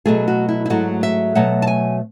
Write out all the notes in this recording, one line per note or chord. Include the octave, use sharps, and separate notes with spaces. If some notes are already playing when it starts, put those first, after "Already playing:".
B2 F#3 A3 G#4
F#4
E4
E4
G#2 F#3 A3 F#4
E5
B2 F#3 A3 F#5
A5
G#5